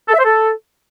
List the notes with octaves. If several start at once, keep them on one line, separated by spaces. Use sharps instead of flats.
A4
E5
C5
A4